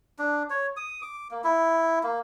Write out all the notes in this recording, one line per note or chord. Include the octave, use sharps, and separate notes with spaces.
D4
C#5
D#6
D6
A#3
E4
A#3